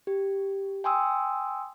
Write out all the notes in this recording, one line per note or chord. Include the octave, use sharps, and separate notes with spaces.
G4
G5 G#5 C6 D#6 E6